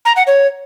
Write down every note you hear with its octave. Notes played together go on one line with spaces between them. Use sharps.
A#5
F#5
C#5